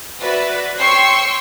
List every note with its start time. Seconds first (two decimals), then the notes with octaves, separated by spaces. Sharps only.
0.19 F#4 B4 D5 E5
0.79 C#5 G5 C6 C#6 E6 C7